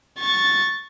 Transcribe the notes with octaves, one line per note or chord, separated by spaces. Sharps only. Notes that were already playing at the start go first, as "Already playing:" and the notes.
C#6 A6